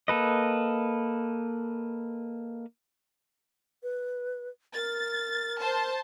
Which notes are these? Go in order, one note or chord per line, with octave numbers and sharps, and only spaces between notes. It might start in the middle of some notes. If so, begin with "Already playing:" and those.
A#3 A4 B4 D#5
B4
A#4 A6
C5 A5